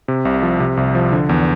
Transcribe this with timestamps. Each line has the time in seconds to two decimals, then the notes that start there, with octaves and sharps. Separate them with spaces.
0.08 C3
0.25 C2
0.43 F3
0.60 C3
0.77 C2
0.95 F3
1.12 D3
1.29 E2